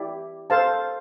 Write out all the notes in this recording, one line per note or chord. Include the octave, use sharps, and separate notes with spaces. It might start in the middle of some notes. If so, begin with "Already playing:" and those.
Already playing: E4 G4 D5
A4 C5 F5 A5